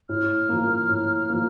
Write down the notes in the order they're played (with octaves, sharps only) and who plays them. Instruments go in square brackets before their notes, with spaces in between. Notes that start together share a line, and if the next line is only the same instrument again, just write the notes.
[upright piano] A2 [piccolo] F6
[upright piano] F3 A#3
A2
F3 A#3